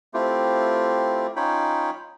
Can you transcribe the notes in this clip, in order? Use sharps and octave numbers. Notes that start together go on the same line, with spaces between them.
A3 C4 E4 F4 G4
C#4 D#4 F4 C#5 G5 B5